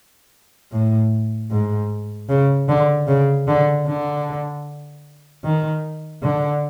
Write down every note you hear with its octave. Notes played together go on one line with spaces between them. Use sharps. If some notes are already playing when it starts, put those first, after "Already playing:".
A2
G#2
C#3
D3
C#3
D3
D3
D#3
D3